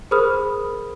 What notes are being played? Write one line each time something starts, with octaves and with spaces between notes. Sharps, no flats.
G#4 A#4 C5 B5 D#6 F6